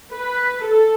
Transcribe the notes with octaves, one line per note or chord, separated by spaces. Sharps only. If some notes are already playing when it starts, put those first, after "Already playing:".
B4
A4